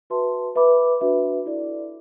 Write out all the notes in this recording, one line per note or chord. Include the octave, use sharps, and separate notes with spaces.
F#4 B4 E5 A5 C6
B4 E5 B5 D6
D4 F#4 B4 E5
E4 A4 D5